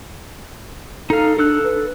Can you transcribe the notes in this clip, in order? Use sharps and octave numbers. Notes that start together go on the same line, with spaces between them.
D#4 A4 F5
D4 A4 E6 F#6
B4